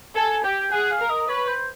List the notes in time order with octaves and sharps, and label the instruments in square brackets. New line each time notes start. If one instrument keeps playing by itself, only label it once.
[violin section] A4 [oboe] G#5
[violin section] G4 [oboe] G5
[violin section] G#4 [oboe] F#5
[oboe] F5
[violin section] A#4
[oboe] D#5
[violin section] B4 [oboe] C#5
[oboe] C5